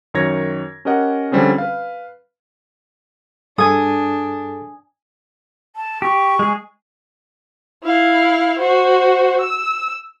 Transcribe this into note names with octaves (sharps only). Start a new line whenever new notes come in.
F#2 D#3 C#5 G#6 A#6
C#4 G4 A#4 D#5 F#5
D3 F3 G3 C4 C#4 G#4
B4 F5
G2 D4 G#4 A4 G#5 D#6
A5
G4 C#6
G#3 G#4
E4 F5
F#4 C5
E6